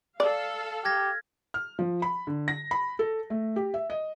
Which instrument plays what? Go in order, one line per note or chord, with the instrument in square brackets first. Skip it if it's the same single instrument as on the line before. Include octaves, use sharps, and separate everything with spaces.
[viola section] A4 F5 [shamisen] D5
[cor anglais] G4 [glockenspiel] F6 G#6 A#6
[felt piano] F6
F3
B5
D3
A#6
B5
A4
A3
G4
E5
D#5